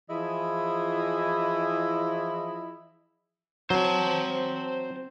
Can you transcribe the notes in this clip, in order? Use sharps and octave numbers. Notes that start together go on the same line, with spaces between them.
E3 F3 E4 G#4 D#5
F#3 C4 C5 A5